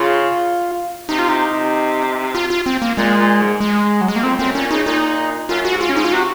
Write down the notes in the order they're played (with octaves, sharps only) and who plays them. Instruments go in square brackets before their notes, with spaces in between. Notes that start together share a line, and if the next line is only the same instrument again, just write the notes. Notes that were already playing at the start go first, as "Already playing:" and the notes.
Already playing: [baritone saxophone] C#3 [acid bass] F4
[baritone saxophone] C3 [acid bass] D#4
[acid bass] F4
[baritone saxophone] C3 [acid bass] D#4
[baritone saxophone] C3
[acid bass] F4
F4
C4
A#3
[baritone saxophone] A#2 [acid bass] G#3
[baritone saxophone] A#2
G#2
[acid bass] G#3
F#3
G#3
A#3
[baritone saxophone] F2 [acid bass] C4
[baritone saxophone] F#2 [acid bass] C4
[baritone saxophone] A#2 [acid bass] C#4
[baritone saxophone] C#3 [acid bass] D#4
[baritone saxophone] A#2 [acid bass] D#4
[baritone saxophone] F#2 [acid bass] F4
[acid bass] F#4
[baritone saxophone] G#2
[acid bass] F4
[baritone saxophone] G#2 [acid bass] C#4
[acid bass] D#4
F4
[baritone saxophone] C3 [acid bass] F#4